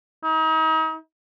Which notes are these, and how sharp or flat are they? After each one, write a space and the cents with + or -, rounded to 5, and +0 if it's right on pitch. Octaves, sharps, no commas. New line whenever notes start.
D#4 +40